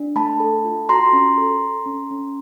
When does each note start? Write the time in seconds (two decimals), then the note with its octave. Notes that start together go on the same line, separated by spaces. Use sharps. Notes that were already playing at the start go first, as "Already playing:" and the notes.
Already playing: D4
0.16 A3 A5 B5
0.40 A4
0.65 F4
0.89 F#4 A#5 C6
1.13 C#4
1.38 A4
1.62 A4
1.86 C#4
2.11 C#4